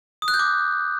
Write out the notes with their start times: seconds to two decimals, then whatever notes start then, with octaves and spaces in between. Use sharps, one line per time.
0.22 D#6
0.28 F#6
0.34 G6
0.39 D6